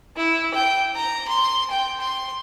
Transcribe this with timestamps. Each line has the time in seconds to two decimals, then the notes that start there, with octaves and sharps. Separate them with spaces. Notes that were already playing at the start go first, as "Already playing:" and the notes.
0.17 E4
0.54 G5
0.95 A#5
1.28 C6
1.70 G5
2.01 C6